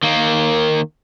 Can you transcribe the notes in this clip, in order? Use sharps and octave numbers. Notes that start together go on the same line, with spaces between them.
D#3 A#3